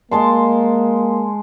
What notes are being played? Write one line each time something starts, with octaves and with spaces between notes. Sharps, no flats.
G#3 A#3 A5 C6